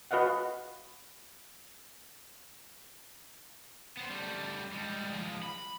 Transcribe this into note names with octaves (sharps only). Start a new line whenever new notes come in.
F#4 B4 D#5 F5 F#5
B3 C5
G3 A3
G3 G#3
F3 G#3
B5